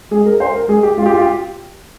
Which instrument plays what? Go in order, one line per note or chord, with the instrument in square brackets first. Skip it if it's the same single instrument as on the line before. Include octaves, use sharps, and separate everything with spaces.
[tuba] G#3 [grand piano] G#4
[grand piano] A#4
C5
A#4
[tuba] G#3 [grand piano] G#4
[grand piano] G4
[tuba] G#3 [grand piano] F4
[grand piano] G4
F4
G4